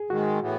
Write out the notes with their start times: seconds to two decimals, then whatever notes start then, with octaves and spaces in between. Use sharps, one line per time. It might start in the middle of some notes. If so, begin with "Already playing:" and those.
Already playing: G#4
0.10 G#2 D#3 G#3 F#4
0.40 A2 E3 B3